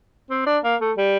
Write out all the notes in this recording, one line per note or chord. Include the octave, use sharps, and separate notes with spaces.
C4
D4
A#3
A3
G3